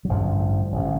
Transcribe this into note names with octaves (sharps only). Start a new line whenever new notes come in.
F#3
A1 G2 D3 F3
A1
D3